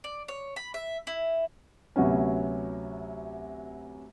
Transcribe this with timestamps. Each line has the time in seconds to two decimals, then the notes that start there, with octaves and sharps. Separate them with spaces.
0.04 D5
0.28 C#5
0.56 B5
0.74 E5
1.07 E4
1.96 D2 C3 F#3 B3 C#4